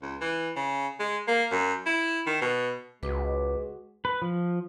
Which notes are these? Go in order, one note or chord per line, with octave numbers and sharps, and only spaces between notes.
C#2
E3
C#3
G#3
A#3
F#2
E4
D#3
B2
C#2 G#3 F#4 B4 D6
B4
F3